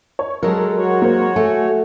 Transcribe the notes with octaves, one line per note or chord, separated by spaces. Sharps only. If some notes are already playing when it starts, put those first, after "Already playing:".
C#5
F#3 G#3 A4 A#4
F#4 C#5
A#3 A#4 C5
A3 G#5